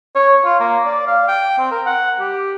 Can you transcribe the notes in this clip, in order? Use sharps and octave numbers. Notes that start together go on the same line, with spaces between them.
C#5
F4
A#3
D5
F5
G5
C4
A#4
F#5
G4